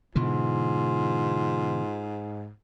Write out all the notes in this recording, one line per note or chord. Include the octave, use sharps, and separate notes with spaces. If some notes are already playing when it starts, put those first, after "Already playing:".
G#2 B2 D3 E3 F4